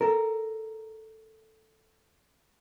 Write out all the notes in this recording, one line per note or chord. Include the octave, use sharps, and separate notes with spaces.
A4 A#4